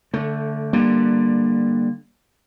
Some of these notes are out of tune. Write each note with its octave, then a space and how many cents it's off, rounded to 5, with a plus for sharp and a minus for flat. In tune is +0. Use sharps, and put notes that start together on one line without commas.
D3 -15 A3 +10
D3 +20 G3 +10 A#3 +20